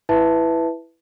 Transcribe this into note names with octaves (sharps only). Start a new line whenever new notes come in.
E4 B4 E5 A5